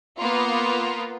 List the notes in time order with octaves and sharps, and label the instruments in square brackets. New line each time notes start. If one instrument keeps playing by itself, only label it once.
[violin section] A#3 B3 F4